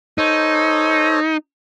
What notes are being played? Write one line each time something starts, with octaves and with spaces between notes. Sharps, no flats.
D#4 A4 C5 C#5